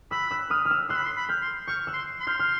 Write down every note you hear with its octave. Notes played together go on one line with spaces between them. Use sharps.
B5 E6 F#6
E6 F#6
D#6 F6
F6
E6 F#6
C6 E6 F#6
B5
C6
B5
F6 G6
C6
C#6 F6 G6
E6 F#6
C6
C6
F6 G6
F6